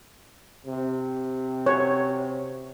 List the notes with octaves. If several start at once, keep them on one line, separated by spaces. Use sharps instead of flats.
C3
C#5